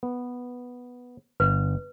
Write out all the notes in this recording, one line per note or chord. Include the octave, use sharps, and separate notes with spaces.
B3
G1 B4